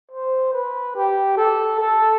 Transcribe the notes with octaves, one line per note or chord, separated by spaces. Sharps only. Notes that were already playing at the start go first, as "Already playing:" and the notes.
C5
B4
G4
A4
A4